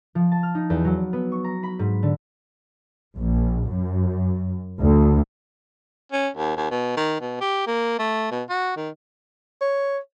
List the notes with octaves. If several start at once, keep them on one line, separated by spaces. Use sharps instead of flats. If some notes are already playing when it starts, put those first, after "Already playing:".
F3
A5
F6
D#4
E2
F#3
B3
C#6
A#5
B5
G#2
D3
A#1
F#2
D2
C#4
D#2
D#2
B2
D#3
B2
G4
A#3
A3
B2
F#4
D#3
C#5